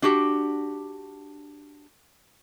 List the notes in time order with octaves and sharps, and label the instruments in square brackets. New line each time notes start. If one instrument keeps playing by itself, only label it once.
[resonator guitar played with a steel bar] D4 F#4 G4